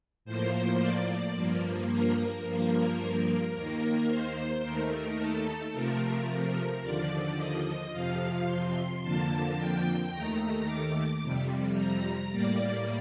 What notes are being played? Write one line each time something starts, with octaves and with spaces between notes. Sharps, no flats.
A2 F3 A#3 C5
D5
G2 F3 A#3
A#4
G2 F3 A#3
D#2 D#3 A#3 A#4
C5
D#2 D#3 A3 A#4
A4
C3 F3 A3 A#4
A#4
D#2 D3 F3 D5
D#5
F2 C3 F3 F5
C6
F2 D3 F3 A#3 A5
G5
D#2 D#3 A3 A#5
D6
F2 C3 G3
A#5
A2 G3 A#3 D5